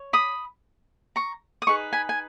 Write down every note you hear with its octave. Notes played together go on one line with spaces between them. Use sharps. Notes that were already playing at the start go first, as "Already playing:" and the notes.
Already playing: C#5
B5 D#6
A#5 C#6
D#6
D#4 G#4 B4 C#6
G#5 B5
G#5